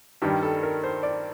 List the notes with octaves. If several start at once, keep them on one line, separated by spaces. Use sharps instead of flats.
G2 D#3 G3 G4
A4
A#4
C5
D5